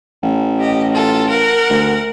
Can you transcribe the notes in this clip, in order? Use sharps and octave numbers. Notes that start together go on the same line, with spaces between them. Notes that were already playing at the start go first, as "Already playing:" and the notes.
A1
G4 D#5
F4 A4
A#4 F#5
D2